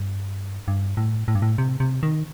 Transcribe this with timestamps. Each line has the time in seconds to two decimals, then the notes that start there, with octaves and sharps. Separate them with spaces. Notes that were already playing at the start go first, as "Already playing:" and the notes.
Already playing: G2
0.68 G2
0.97 A2
1.28 A2
1.35 G2
1.42 A2
1.58 C3
1.80 C3
2.03 D#3